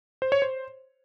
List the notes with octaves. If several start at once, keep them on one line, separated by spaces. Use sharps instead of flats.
C5
C#5
C5